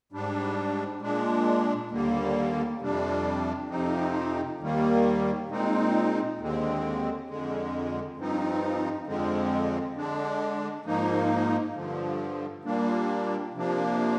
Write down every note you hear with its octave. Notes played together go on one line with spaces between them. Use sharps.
G#2 G3 D4
A#2 G#3 D4
D#2 D3 G3 A#3
F2 C3 G3 D4
F2 C3 F3 C4 D#4
D#2 D#3 G3 A#3
A#2 G#3 C4 D#4
D#2 D3 G#3 C4
F2 D3 G#3
G2 F3 C4 D#4
F2 D3 F3 G#3 C4
D3 G#3 D4
G#2 F3 A#3 D#4
G2 D3 F3
A#2 G3 A#3 D4
C3 F3 A#3 D4